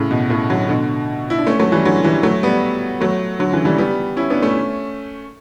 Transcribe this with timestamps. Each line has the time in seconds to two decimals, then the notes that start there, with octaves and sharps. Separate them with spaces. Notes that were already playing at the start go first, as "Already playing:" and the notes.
Already playing: A2 C#3
0.11 B2
0.30 A2 C#3
0.50 D3 F#3
0.69 B2 D3
1.30 E4
1.38 D4
1.47 A3 C#4
1.59 F#3 A3
1.72 E3 G3
1.85 D3 F#3
2.04 E3 G3
2.23 F#3 A3
2.43 G3 B3
3.01 F#3 A3
3.39 D3 F#3
3.52 C#3 E3
3.65 E3 G3
3.78 G3 B3
4.17 C#4 E4
4.30 B3 D4
4.42 A3 C#4